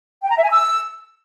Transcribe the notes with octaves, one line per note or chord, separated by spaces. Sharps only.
G5
A#5
E5
G#5
E6